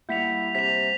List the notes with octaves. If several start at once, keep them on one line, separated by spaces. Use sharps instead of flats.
G3 A#3 E4 F#5 G6 B6 F7
C3 B6 F7